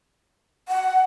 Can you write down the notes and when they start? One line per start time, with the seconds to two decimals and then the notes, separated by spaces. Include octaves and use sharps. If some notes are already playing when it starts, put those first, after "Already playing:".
0.68 F#5